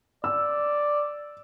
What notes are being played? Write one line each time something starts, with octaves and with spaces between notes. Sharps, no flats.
D5 E6